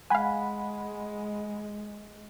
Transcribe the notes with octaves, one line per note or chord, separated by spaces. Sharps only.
G#3 F5 F#5 G#5 B5